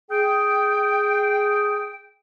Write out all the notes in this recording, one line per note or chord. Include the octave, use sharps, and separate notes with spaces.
G#4 G5